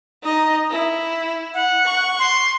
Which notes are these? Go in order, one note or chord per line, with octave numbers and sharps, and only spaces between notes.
D#4 D#5
E4
F#5
C#6
C6